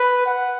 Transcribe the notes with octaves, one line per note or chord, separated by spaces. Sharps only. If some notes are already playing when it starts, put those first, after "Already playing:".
Already playing: B4
F#5